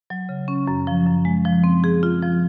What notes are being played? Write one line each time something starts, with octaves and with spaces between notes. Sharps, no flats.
F#3
C#3
C#4
F#2
F3
F#2
G#3
F3
C4
G#4
F4
F3